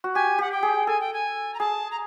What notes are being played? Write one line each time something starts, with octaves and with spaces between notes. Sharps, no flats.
F#4
G4 G#5
G4 F#5
G5
G#4
A4 G#5
G5
G#5
A#5
G#4 A5
A#5